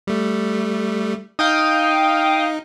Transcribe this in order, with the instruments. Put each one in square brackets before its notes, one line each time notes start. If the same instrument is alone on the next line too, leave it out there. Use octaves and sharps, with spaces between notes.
[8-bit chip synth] G3 A3
[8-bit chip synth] D#4 [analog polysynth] F5 G5 D#6